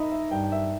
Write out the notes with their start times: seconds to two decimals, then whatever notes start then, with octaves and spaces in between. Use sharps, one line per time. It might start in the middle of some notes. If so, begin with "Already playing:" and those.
Already playing: D#4 D#5 E5 B5
0.12 E5
0.31 G2 G5
0.44 G5
0.52 E5